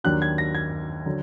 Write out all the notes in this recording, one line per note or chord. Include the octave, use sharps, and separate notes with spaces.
D#2 D#3 F#3 D4 F#6
G#6
A#6
G#6
D3 F#3